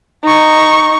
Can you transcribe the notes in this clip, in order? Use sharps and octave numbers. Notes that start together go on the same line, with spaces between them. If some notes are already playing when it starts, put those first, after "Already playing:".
D#4 C#6